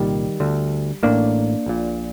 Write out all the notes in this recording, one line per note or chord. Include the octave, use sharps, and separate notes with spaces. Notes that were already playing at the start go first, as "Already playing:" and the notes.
Already playing: C2 A#2 D#3 G3
D2 D3
A1 A2 A#3 D4
A#1 A#2